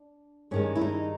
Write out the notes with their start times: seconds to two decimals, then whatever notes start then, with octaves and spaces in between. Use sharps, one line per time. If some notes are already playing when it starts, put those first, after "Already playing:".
Already playing: D4
0.51 G2 D#3 G#3 C#4
0.75 E4
0.81 D#4